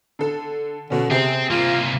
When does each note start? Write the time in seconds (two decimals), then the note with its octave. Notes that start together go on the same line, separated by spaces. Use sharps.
0.19 D3 A4
0.90 B2 D3 C#4
1.11 C3 C4 G#4 C5
1.51 C2 A#3 F4